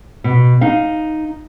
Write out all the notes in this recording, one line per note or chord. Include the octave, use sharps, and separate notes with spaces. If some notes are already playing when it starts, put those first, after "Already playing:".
B2
D#4 F5